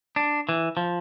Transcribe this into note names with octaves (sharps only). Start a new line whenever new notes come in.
D4
E3
F3